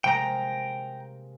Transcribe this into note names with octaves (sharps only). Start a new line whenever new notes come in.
C3 G#3 A#3 G5 A#5